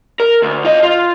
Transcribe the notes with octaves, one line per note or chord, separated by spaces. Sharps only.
A#4
D2
F4 D#5
F4